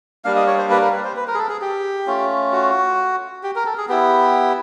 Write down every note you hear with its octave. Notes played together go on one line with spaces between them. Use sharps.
G3 A#3 D4 F5
D#5
C#5
C5
B4
A#4
B4
C5
B4
A#4
G#4
A4
G#4
G4
A3 C#4 F4
F#4
G4
A#4
A4
G#4
B3 E4 G4